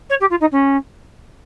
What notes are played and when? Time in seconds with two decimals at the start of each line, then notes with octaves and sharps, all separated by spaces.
0.10 C#5
0.21 G4
0.30 F4
0.41 D#4
0.52 C#4